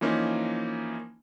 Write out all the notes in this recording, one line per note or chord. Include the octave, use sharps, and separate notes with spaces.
E3 F3 A#3 C#4 D#4